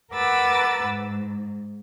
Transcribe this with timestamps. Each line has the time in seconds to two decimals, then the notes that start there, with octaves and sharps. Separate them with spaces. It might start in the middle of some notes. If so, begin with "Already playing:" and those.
0.12 A#4 B4 F#5 D6 E6 A6
0.82 G#2